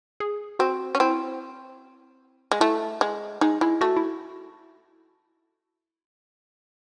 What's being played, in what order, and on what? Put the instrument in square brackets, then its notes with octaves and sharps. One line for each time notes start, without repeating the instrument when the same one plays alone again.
[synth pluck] G#4
[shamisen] C4 [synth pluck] F#4
[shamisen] C#4
[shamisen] C4 [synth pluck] E4
[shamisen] G#3
[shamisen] A3 [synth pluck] E4
[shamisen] G#3
[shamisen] G#3 [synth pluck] D#4
[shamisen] G#3 [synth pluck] E4
[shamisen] A3 [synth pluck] F#4
[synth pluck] E4